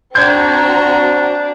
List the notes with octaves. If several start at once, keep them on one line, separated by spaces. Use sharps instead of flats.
C4 D4 F#4 A#5 G6 G#6